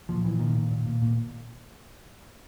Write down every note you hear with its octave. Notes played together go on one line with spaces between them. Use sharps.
A#2 F3
A#2 E3
A#2 D#3
A#2
A#2
A#2
A#2